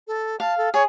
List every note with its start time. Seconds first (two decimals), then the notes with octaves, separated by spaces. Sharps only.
0.07 A4
0.40 F5 A5
0.57 A4
0.74 G#4 C#5